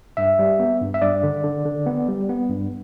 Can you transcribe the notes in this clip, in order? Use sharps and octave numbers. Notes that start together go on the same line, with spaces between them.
G2 E5
G3
B3
G2
E5
G2 D5
D3
D3
D3
B3
G3
B3
G2